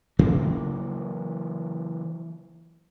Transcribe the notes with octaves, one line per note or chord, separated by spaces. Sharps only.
C#3 E3 F#3 A#3